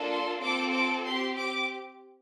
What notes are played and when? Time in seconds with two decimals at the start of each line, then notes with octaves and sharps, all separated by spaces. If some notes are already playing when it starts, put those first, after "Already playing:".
Already playing: A#3 D4 F4 A4
0.11 C6
0.42 C4 F4 A4 D6
0.73 D6
1.05 C4 G4 C6
1.38 D6